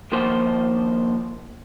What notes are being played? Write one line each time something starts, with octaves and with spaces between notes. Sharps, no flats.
D#3 F3 A#3 C5